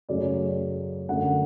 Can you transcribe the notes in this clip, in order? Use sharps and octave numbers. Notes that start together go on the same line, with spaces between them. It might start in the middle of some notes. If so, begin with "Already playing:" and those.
F#2 C#3 F#3 A3 C#4 D5
F#2 D3 A3 F#5